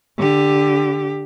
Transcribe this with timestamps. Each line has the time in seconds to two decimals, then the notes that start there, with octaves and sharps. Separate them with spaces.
0.17 D3 G4